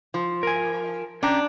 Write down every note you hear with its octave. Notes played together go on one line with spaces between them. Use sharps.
F3
A#4 G#5
C#4 D4 G5 A#5